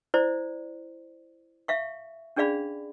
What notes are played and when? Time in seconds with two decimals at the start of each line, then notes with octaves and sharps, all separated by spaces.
0.14 E4 C5 D5
1.68 E5 F5 C#6
2.36 C#4 D4 G#4 D5 F5 B5